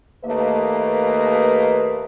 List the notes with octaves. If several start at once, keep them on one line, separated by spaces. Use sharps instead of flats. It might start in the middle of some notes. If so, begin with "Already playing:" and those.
D#2 A3 A#3 B4 D#5